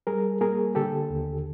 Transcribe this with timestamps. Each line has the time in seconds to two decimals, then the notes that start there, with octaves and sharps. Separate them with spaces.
0.07 G3 G#4 A#4
0.41 A#3 G#4 A#4
0.75 D3 G4 A4
1.10 D#2